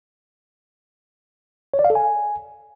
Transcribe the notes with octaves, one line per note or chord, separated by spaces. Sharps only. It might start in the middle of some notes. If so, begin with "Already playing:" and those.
C#5
D5
F5
A4
G#5